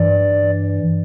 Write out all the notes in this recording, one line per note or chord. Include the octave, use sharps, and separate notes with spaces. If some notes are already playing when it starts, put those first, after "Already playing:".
Already playing: G2 E3 D5